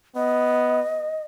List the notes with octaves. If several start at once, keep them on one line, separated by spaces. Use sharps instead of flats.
B3 D#5